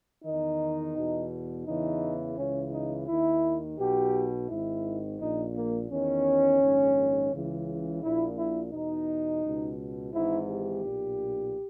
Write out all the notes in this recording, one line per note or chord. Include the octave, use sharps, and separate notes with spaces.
E2 D#3 D#4
E2 B2
E2 C#3 E3 D#4
C#2 C#3 E3 C#4
D#4
D#2 D#3 E4
B1 B2 G4
G#1 G#2 D#3 E4
A#1 A#2 D#4
A#3
E2 D#3 C#4
A#1 G#2 D#3
C#2 C#3 E3
A#1 A#2 E4
E4
E2 B2 D#4
C#2 B2
G#1 G#2 E3 E4
G4
B1 A#2